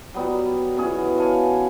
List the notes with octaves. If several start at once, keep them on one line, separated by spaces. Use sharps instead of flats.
F#3 G3 B3
B2 E3 C#4 G#4
C#5 F5 G#5 A5